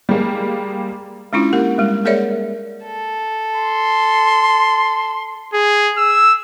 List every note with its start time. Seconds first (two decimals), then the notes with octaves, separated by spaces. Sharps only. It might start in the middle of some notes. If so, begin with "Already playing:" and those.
0.09 G3 G#3 A#3
1.33 G#3 C#4 D4 E4 F4
1.53 A#3 G4 A#4
1.78 G3 G#3
2.05 A#3 G#4 A#4 C#5 D5 E5
2.85 A4
3.56 C6
5.53 G#4
5.97 E6